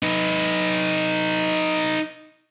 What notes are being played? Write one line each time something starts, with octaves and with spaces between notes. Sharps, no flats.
D#4 B4